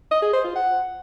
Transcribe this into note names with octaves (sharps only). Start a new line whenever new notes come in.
D#5
G#4
C5
F4
F#5